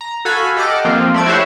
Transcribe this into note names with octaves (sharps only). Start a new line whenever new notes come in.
A#5
F#4 A4 F5 G#5 B5
G4 A4 D#5 F#5 D6 F6
F3 A#3 C4 F4
A3 D5 G#6
E4 F#4 G4 C5 C#5 E5